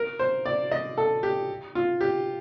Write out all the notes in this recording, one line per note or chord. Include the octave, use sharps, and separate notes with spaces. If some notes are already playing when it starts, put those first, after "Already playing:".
Already playing: A#4
C5
D5
D#5
A4
G4
F4
G4